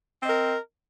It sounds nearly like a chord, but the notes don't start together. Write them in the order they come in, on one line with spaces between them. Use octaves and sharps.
C4 D#5 A#4